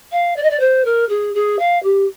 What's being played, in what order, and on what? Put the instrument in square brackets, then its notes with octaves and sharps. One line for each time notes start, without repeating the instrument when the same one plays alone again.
[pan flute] F5
D5
D#5
D5
C5
A#4
G#4
G#4
F5
G4